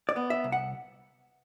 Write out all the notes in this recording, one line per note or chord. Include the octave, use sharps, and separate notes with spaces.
D5
B3
E5
C2
F#5